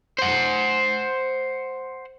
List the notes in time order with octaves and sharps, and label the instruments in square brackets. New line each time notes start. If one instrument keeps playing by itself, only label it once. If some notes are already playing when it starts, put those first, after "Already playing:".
[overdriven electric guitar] C5 F#5